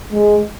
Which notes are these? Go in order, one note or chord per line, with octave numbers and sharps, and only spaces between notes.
G#3